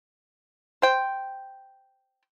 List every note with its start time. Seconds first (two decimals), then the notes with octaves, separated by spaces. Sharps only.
0.82 C5 G5